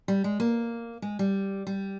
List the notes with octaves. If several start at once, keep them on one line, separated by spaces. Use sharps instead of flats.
G3
G#3
A#3
G#3
G3
G3